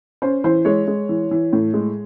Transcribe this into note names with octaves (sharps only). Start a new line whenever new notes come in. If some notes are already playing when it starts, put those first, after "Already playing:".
C#4 C5
E3 C5
G#3 C#5
G#3
E3
E3
A2
G#3